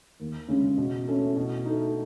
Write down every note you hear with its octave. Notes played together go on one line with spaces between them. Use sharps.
D#2
C#3 G#3 C#4
B2
A3 C#4 E4
B2
A3 D#4